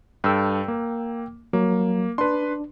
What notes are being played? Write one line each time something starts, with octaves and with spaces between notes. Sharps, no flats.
G2 A4 G5 E6
A#3
F#3 A#3
D4 B4 C6